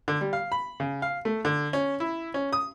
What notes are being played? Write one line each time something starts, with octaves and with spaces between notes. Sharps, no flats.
D3
G3
F5
B5
C#3
F5
A3
D3
C#4
E4
C#4
D#6